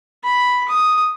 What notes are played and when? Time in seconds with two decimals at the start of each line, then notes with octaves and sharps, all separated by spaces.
0.24 B5
0.68 D#6